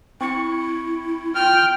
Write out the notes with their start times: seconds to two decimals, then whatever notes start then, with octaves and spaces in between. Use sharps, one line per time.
0.21 C4 E4 C#6 C#7
1.35 F4 G5 F6